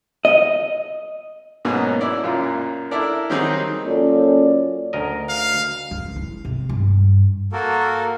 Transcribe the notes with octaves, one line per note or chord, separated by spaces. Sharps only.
D#5
G#2 B2 F#3 A#3 C#4
C#4 E4 D5
F#2 A#2 F4
D4 E4 A4 A#4 D5
D#3 F#3 G3 C4 D#4 G#4
F#2 A#3 C#4 F4 A4 D5
D2 A#4 D#5
F5
C#2
E4
C3
G2
A#3 F#4 A4 A#4